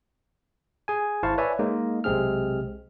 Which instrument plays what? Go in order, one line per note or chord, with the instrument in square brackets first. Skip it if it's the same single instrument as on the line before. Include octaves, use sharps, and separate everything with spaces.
[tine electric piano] G#4 G#5
G#1 E4 C5 F5 A5 C#6
B4 C#5 D5 E5 G#5
G#3 A#3 D#4
B1 C3 G#3 C4 G#4 F6